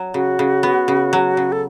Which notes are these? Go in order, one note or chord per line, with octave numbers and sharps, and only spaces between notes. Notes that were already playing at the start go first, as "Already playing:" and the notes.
Already playing: F#3
C#3 F#4
C#3
B3
C#3
F#3
C#3
A4